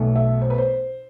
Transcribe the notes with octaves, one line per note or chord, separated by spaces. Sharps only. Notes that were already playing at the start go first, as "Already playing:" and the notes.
Already playing: B1 B2 A3
E5
C5
B4
C5